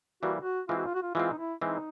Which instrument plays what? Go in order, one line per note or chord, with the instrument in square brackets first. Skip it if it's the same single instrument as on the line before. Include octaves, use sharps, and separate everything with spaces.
[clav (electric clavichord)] E3 G3 A#3 [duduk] F#4
[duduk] F#4
[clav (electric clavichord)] E3 G#3 C4 [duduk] F4
[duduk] F#4
F4
F#4
F4
[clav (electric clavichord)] E3 G#3 C4 [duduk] F4
[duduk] D#4
E4
[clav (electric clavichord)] E3 G#3 C4 [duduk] D#4